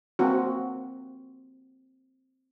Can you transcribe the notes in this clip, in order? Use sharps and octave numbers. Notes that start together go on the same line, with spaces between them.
A#3 C4 F#4